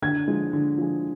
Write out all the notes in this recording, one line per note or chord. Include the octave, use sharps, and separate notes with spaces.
D3 G#6
F3 G#3
D3
F3 G#3